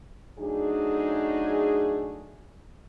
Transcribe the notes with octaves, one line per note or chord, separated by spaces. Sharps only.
F#3 A3 D4 D#4 G#4